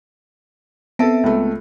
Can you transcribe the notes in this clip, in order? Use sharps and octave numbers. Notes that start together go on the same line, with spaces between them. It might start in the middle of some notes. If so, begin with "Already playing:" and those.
B3 C4 A4 E5 A5
C#2 A3